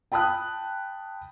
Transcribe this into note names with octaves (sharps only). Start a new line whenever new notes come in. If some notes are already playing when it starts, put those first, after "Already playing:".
G5 A5 B5 D#6 F#6